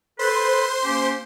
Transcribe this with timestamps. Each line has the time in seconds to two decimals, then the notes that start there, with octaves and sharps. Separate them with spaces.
0.19 A4 B4 C5 C6
0.83 A#3 C#4 G4